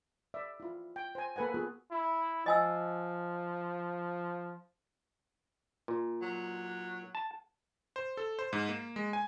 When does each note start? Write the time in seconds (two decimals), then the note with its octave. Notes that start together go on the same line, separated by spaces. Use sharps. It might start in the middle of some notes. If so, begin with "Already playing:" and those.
0.34 D5 E5
0.60 E4 F4
0.96 G5
1.15 C5 G#5
1.36 A#3 A4 B4 F#5 G#5
1.54 B3 F4 F#4 G#4
1.91 E4
2.46 F3 D#5 G#5 E6
5.88 A#2
6.22 F#3
7.15 A5
7.96 C5
8.17 A4
8.39 C5
8.53 G#2
8.69 A#3
8.96 G#3
9.13 G#5